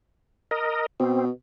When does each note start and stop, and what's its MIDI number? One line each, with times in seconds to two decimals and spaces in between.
0.51 0.86 70
0.51 0.86 75
1.00 1.30 47
1.00 1.25 60